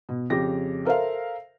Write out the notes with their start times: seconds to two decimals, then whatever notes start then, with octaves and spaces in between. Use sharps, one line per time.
0.09 B2
0.30 F2 C#3 G4 A#6
0.85 A4 A#4 C5 E5 F5